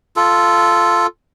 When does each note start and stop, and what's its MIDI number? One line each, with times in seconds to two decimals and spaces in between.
0.16 1.07 65
0.16 1.07 69